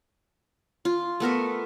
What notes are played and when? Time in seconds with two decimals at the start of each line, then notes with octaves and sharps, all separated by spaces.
0.85 F4
1.20 A3 B3 A#4 E5